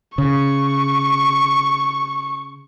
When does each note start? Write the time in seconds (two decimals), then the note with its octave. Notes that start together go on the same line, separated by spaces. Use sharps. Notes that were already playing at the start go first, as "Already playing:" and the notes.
0.18 C#3 C#6